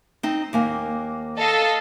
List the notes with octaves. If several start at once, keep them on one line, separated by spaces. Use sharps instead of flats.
C4 D#4
D#2 A#3 G#5
A4 D#5 F5